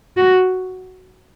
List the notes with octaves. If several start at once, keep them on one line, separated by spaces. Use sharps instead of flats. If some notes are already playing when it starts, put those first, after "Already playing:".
F#4